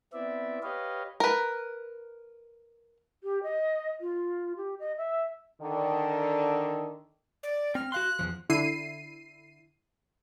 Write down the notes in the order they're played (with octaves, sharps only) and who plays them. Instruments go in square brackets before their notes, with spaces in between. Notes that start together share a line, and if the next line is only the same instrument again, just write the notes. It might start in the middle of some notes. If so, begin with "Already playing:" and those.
[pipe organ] B3 C4 E4 D5 E5
G4 B4 C#5 D#5 F5
[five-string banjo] A#4 B4
[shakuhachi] G4
D#5
F4
G4
D#5
E5
[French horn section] D3 D#3
[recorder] D5
[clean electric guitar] C4 [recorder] F6
[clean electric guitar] F#4 F5 C6 [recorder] F#6
[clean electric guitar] E2 A#2 F3
[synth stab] D3 E4 C7 D#7